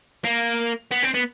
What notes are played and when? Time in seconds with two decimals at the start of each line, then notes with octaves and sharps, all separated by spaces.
0.25 A#3
0.91 B3
1.03 C4
1.14 B3